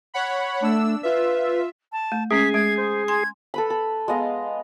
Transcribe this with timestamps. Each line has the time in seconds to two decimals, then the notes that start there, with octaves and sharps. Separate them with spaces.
0.14 C#5 F#5 B5
0.62 A3 D4 E6
1.03 F4 B4 E5
1.92 A5
2.12 A3
2.31 G#3 C#4 G#4 B6
2.54 G#3 G#6
2.77 C5
3.08 G#5 C6 G#6
3.54 A4 B4 B5
3.70 A4
4.08 G#3 B3 D#5 F5